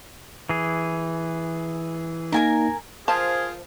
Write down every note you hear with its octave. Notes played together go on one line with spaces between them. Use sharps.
E3 G#4
A#3 D#4 A#4 G#5 A#5
F3 F4 G#4 A#4 C5 A5